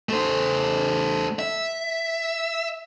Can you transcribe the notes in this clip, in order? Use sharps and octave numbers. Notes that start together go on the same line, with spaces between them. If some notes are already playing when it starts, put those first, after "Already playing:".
A3 C5
E5